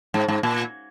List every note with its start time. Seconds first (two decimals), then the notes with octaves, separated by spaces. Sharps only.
0.14 G#2
0.28 G#2
0.43 A#2